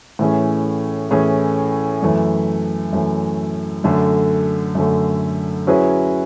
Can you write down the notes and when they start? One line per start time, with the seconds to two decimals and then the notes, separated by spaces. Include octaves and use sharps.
0.19 A2 E3 A3 C#4 G#4
1.11 A2 E3 A3 C#4 G#4
2.03 F#2 E3 A3
2.93 F#2 E3 A3
3.84 F#2 D3 A3
4.75 F#2 D3 A3
5.67 F#3 C#4 E4 G#4 B4